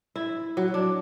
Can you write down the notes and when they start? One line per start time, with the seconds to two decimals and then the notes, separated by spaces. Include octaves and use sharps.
0.16 E4
0.57 F#3
0.74 D4